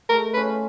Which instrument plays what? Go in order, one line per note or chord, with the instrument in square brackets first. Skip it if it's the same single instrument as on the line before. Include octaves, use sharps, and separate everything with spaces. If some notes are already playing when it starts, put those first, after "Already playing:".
[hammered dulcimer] A3 [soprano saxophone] A#4
[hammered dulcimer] F4 [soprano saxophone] B4
[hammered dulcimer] C#4